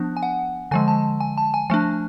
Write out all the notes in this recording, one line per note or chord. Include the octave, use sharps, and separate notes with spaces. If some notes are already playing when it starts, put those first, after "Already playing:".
Already playing: F3 B3 D4
G#5
F#5
D3 F3 G#3 G#5
A5
G#5
A5
G#5
F3 A3 D4 G#5